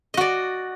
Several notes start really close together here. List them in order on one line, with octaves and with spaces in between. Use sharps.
D#5 F#4 D5